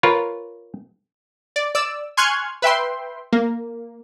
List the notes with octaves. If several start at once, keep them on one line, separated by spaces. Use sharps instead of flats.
F4 A#4 B4 C#5
D5
D5 E6
G#5 C6 C#6 F6 F#6 G#6
B4 E5 G5 C6
A#3